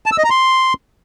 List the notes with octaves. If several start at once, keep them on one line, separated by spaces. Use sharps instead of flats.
A5
E6
D#5
A#5
C6